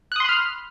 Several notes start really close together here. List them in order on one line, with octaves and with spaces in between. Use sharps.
F#6 D#6 C6 B5 F6